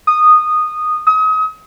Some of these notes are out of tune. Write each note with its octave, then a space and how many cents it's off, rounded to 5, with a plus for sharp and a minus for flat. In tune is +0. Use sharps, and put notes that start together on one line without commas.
D#6 -15
D#6 +35